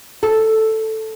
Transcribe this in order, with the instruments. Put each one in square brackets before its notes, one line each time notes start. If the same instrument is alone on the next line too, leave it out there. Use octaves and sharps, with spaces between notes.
[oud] A4